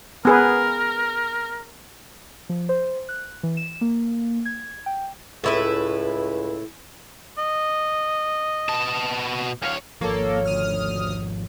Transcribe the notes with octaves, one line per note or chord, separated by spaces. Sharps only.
B3 G#4 A#4 B4
F3
C5
F#6
E3
E7
A#3
G#6
G5
C#2 A2 E4 B4
D#5
B2 A5
D2 C#5 F5
G#1 F3 A#3 A4 C#5
D2 D#6 F6